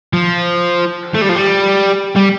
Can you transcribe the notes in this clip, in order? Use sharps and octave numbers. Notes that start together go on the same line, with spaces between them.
F3
A3
G3
F3
G3
G3